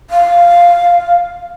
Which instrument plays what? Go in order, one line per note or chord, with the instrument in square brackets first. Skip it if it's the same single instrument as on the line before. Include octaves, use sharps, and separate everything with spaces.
[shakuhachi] F5